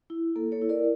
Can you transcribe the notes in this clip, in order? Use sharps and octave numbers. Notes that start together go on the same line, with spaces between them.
E4
A#3 A4
A4 C#5
E4
A#4 D5